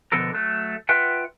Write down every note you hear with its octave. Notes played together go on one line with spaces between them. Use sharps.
B2 D3 F3 B3 A4 A#4
F#3 A3
F4 B4 E5 F#5 G5